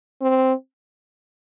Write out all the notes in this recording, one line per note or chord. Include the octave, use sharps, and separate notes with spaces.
C4